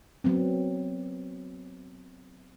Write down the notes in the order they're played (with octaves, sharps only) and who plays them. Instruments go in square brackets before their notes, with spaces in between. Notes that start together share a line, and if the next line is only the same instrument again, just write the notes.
[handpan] F#3 B3 C4